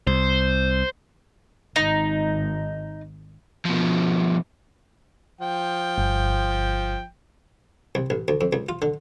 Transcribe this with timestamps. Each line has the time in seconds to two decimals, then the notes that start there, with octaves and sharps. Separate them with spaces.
0.07 C2 C5
1.76 G#1 D#4
3.65 B2 F3
5.41 F3 G5
5.98 G1
7.95 C2
8.10 A1
8.28 D2
8.41 F2
8.53 C#2
8.69 F4
8.82 D3